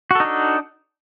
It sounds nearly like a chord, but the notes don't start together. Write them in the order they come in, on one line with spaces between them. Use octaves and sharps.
F#4 A4 D#4 D4